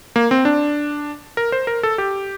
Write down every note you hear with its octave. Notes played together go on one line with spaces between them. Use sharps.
A#3
C4
D4
A#4
C5
A#4
A4
G4